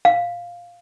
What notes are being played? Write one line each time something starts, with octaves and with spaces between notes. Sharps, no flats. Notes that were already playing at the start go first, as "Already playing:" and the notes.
F5